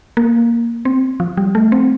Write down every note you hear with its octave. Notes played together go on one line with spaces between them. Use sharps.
A#3
C4
F3
G3
A3
C4